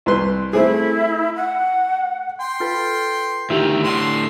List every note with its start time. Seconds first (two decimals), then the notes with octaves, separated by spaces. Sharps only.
0.06 C2 B4 C6
0.53 A3 C4 E4 G#4
1.35 F#5
2.40 G5 C6
2.60 F4 A4 B4
3.50 D2 D#3 E4 G4 F7
3.84 A2 D3 C6